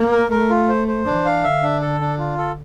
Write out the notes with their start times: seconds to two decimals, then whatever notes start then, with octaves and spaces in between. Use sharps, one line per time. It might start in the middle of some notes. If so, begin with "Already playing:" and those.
Already playing: A#3
0.12 A#4
0.31 A3 A#4
0.50 F4
0.69 C5
0.88 C5
1.06 E3 D4
1.25 F5
1.44 D3 E5
1.63 D4
1.81 A4
2.01 D4
2.19 F4
2.38 A4